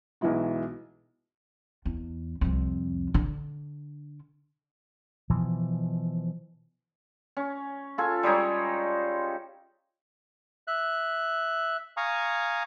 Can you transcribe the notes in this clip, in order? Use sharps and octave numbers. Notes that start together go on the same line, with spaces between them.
B1 E3 G#3 E4 F#4
E2
C2 F2
D3 D4
B2 E3 F3
C#4
F4 A4 G#5
G3 G#3 D#4 C#5
E5 F#6
F5 G#5 A#5 C#6 D#6